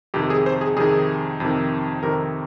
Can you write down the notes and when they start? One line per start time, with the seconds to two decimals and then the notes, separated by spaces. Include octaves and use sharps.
0.14 F2 C3 D#3 G4
0.30 G#4
0.46 C5
0.61 G#4
0.77 F2 C3 D#3 G#4
1.40 F2 C3 D#3
2.03 F2 C3 D#3 A#4